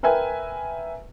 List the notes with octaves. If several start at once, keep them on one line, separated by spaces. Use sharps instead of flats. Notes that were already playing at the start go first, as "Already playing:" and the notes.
A#4 B4 E5 G5 G#5